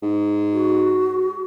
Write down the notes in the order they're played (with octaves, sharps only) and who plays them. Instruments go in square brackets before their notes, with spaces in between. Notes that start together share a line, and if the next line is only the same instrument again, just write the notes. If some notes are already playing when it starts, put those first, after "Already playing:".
[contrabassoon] G#2
[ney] F#4